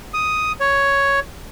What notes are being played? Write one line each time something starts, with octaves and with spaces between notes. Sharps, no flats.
D#6
C#5